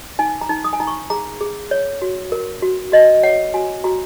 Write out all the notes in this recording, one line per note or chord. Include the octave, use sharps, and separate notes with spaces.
D#4 G#5
A#5
D#4
D#6
G#5
D#4 A#5
C#6
G#4 A#5
G#4
C#5
F#4
A#4
F#4
F#4 D#5
C#5 F#5
F#4 G#5
F#4 A#5